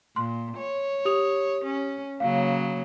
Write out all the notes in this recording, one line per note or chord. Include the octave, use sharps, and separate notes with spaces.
A#2 C6
C#5
G4 D#6 F7
C#4
C#3 F#3 A#3 F5